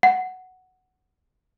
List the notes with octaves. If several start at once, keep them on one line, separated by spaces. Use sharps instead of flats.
F#5